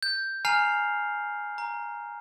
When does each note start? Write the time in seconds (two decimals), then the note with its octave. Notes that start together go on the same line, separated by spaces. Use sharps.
0.03 G6
0.45 G#5 A#5 F6 C7 F7
1.58 A#5